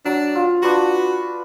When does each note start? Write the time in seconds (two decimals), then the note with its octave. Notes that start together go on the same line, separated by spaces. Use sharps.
0.05 F#3 D4
0.35 F4
0.63 D4 F#4 B4